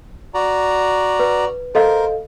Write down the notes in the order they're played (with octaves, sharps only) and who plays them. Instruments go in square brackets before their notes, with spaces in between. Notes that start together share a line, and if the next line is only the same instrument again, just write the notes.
[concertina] F#4 D5 A#5
[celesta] B4
[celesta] A4 D#5 F5 [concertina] A#4 C5